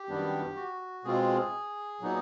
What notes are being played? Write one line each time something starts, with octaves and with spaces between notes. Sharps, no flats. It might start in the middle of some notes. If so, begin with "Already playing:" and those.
Already playing: G4
F#2 D#3 G3 B3 D4
F#4
B2 G#3 C4 F4 G#4
A#2 F#3 B3 D#4